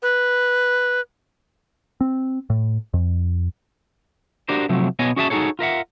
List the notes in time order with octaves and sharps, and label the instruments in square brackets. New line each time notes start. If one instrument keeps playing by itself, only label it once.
[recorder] B4
[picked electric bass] C4
A2
F2
[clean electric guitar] D4 F#4 G4 A#4 C5
C3 F3 F#3 A3
B2 B3 C#5 D#5 G#5
C#4 F#4 G#4 E5 G5 A5
D#4 F#4 G#4 A4 C#5
F4 A#4 E5 F#5